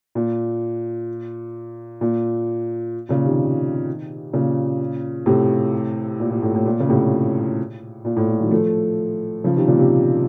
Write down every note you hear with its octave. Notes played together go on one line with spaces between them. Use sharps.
A#2
A#2
A#2 C#3
C3 D#3
A#2 C#3
A2 C3
A#2
A#2
A2
A2
A#2
C#3
A2 C3
A#2
A2
A#2
D#3 F#3
F3 A3
C#3 F3
C3 D#3
A#2 C#3
C3